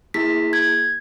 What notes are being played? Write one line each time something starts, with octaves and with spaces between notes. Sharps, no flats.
A#3 E4 G#4 B6
G#6